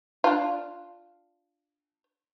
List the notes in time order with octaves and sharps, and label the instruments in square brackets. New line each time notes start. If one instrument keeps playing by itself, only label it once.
[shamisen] D4 F4